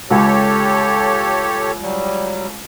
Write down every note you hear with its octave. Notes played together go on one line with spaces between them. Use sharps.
C#2 G4 A4 C#5
F#3 G3